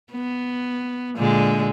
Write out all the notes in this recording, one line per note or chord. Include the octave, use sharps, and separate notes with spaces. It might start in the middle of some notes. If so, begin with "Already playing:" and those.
B3
A#2 D3 G#3